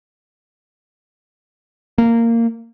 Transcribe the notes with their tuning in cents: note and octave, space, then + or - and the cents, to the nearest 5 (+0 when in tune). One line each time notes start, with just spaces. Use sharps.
A#3 -15